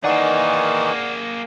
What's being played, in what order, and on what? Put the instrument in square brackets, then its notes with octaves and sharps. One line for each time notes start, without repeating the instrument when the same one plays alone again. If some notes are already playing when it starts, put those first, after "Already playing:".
[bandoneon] D#3 E3 D#4 [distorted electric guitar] A#3 G#4 [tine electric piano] D5 F#5